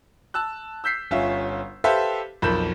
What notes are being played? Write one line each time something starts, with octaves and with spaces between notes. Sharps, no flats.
A5 E6 F#6
E6 G6 B6 C7
G1 C#4 F4 E5
G4 A4 B4 C5 E5 F5
B1 F2 A#4 B5 G6 E7